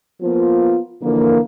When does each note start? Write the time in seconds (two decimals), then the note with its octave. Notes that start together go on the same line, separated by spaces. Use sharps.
0.22 F3 A#3 B3 F4
1.01 D3 E3 F3 A#3